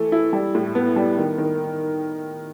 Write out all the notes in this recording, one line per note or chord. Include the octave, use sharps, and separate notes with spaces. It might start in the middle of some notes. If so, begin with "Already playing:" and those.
Already playing: E3 A3
E4
G3
A2
B3
G3
D#3
D#3